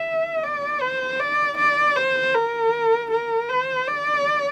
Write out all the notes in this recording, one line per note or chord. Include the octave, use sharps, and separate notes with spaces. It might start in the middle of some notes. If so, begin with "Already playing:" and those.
Already playing: E5
D5
C5
D5
D5
C5
A#4
A#4
C5
D5